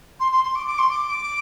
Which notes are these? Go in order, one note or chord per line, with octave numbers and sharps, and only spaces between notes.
C6
C6
C6
D6
D6
C6
D6
D6